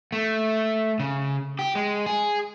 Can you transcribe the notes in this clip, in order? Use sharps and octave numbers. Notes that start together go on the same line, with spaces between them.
A3
C#3
G4
G#3
G#4